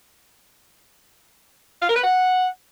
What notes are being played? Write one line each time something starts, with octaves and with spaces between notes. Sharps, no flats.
F5
A#4
B4
F#5